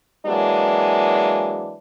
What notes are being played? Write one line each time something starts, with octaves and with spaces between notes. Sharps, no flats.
E3 F#3 G#3 A#3 D4